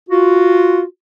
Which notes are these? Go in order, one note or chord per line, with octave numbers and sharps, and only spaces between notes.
F4 F#4